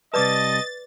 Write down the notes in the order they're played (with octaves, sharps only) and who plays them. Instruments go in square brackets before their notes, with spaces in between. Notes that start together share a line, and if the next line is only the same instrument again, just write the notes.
[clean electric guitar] C3 G3 A5 [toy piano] B4 D5 D6 [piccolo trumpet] D#5 [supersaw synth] A6